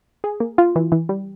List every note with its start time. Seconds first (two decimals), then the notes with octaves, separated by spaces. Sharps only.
0.24 G#4
0.40 A#3
0.58 F4
0.76 E3
0.92 E3
1.09 G3